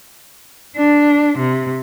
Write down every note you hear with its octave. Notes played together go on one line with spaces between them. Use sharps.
D4
C3